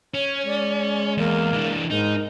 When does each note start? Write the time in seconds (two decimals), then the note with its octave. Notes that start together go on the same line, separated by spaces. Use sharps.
0.14 C#4 C#5
0.46 G#3 D5
1.17 E2 A#3
1.53 E3 D4
1.90 G#2 D#4 A#4